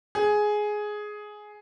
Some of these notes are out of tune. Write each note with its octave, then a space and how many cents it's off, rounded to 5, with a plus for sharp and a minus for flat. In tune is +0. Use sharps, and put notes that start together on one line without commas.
G#4 +10